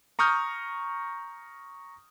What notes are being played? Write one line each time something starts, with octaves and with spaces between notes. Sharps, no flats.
A#5 C#6 D#6 F6 G6